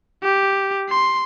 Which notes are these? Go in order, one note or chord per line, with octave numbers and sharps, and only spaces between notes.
G4
C6